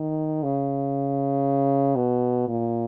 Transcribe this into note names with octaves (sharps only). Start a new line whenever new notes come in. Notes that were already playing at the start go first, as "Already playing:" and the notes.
Already playing: D#3
C#3
B2
A#2